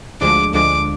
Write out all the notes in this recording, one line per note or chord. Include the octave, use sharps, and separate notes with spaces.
D2 D3 F3 G#3 D4 D6
D2 D3 F3 G#3 D4 D6